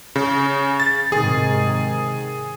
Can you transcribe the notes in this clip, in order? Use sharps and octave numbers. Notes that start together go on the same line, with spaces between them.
C#3
A6
G#2 C3 D#3 G#4